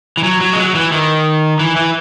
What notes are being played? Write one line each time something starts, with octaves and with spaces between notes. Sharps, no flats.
E3
F#3
F#3
G#3
F#3
E3
D#3
E3
E3